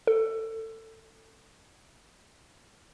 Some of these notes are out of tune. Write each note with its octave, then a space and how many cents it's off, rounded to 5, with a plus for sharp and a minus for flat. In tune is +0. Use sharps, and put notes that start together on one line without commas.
A4 +20